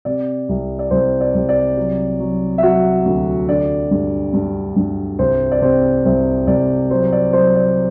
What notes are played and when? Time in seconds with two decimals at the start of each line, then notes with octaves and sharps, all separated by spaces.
0.05 C3 D5
0.49 C2
0.79 D5
0.91 C2 C5
1.20 D5
1.35 C2
1.49 D5
1.77 F#3
2.20 F#3
2.58 E5
2.63 F#3 F#4 F#5
3.05 D2
3.48 D3 D5
3.91 G2
4.33 G2
4.76 G2
5.19 C2 C5
5.52 D5
5.62 C3 C5
6.05 C2 C5
6.47 C2 D5
6.91 F#3 C5
7.12 D5
7.33 F#3 C5
7.55 D5